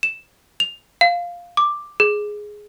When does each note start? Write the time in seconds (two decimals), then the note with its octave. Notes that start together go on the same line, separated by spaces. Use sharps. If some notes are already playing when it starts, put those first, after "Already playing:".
0.03 E7
0.60 F7
1.01 F5
1.57 D6
2.00 G#4